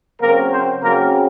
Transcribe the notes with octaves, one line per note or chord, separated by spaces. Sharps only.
C#3 F#3 A#3 C4 A#4
C4 C5
C#3 F#3 A#3 C4 A#4